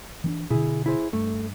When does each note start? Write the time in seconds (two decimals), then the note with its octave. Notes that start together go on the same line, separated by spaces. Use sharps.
0.24 E3 C4 D4
0.50 B2 D3 E4 G#4
0.86 E4 G#4 C5
1.13 G2 A3